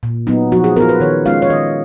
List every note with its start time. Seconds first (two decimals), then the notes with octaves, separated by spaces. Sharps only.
0.03 A#2
0.27 F#3 B3 D#4
0.52 F3 F#4
0.64 G#4
0.76 B3 F4 A#4
0.89 B4
1.00 D#3 C#5
1.26 G#3 C#4 F4 F5
1.42 C#5
1.50 D#3 D#5